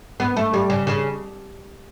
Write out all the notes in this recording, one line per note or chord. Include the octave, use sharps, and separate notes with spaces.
B3
A3
G3
C#3
C#3